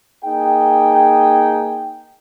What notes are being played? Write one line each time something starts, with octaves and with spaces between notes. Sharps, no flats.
A#3 D#4 G#4 G5